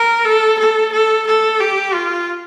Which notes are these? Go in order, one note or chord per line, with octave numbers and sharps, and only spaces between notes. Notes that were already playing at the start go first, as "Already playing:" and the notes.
Already playing: A#4
A4
A4
A4
A4
G4
F4